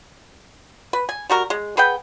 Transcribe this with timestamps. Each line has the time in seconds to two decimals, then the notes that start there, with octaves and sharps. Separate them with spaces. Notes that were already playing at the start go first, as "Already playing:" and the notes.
0.93 B4
1.09 G#5
1.30 G3 F#4 A#4
1.50 G#3
1.77 G#4 B4 F#5 G5